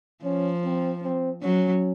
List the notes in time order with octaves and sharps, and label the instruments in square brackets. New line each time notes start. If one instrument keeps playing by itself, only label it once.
[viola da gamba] F3 [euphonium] C#4
[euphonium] C4
C4
[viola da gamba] F#3 [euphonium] C#4